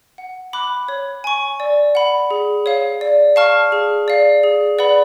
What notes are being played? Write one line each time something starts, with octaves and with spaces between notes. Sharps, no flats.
F#5
B5 D6 F#6
C#5
G#5 C#6
D5
F#5 B5
G#4
C#5 F5
D5
F5 A5 C#6 F6
G#4
D5 F5
G#4
B4 D5 F#5 B5